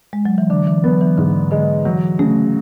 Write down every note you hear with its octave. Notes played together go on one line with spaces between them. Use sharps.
G#3
F#3
E3
D3 D4
E3
F#3 B3
E3
G#2 D3
D3 G#3
E3 F#3
C#3 A3